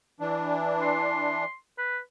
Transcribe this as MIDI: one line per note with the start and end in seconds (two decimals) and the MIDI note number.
0.20 1.45 52
0.20 1.45 62
0.82 1.54 84
1.78 1.99 71